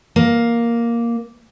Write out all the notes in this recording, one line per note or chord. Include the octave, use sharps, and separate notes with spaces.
A#3